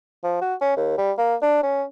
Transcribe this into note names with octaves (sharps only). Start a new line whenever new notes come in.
F3
F#4
C#4
D#2
G3
A#3
D4
C#4